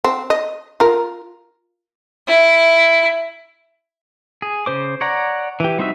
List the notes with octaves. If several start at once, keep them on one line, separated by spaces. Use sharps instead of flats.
C4
D#5
F4 A#4
E4
G#4
C#3 C5 D6
C#5 D5 F#5 A#5
E3 G4
G3 C4 D#4 F#4 E5